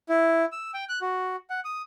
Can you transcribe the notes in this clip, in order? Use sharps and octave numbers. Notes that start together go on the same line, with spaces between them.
E4
E6
G5
F#6
F#4
F#5
D#6